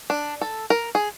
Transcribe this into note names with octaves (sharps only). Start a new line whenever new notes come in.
D4
A4
A#4
G#4